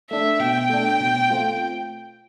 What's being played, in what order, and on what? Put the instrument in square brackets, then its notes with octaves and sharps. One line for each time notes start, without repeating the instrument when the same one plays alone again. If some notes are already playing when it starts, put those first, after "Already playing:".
[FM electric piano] A3 D4 [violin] E5
[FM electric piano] B2 [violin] G5
[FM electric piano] A3 D4
B2
A3 C4 F4